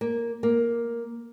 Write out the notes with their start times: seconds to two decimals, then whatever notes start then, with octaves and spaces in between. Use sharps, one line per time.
0.01 A#3
0.43 A#3